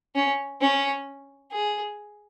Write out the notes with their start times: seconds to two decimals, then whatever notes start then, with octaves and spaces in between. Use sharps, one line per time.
0.15 C#4
0.61 C#4
1.52 G#4